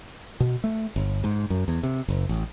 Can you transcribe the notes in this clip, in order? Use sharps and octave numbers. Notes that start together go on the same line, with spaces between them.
B2
A3
G1
G#2
F#2
E2
C3
F#1
A1